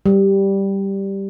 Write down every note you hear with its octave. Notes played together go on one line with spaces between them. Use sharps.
G3